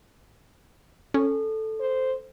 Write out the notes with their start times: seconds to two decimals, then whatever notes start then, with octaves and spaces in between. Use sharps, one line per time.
1.14 C#4 A4
1.80 C5